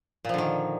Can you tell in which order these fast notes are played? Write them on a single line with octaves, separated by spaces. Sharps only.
A#2 F3 D3 D#3